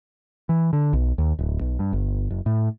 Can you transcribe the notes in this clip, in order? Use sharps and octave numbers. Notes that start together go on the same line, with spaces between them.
E3
D3
B1
D#2
D1
B1
G2
G1
F#1
A2